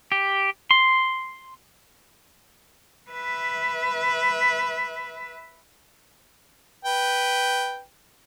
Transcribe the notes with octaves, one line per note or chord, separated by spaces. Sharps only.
G4
C6
B4 E5
B4 G5